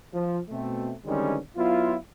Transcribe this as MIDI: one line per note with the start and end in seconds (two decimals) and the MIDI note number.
0.14 0.39 53
0.50 0.93 47
0.50 0.93 57
0.50 0.93 60
1.05 1.37 50
1.05 1.37 51
1.05 1.37 55
1.05 1.37 56
1.05 1.37 60
1.05 1.37 61
1.57 1.95 54
1.57 1.95 59
1.57 1.95 64
1.57 1.95 65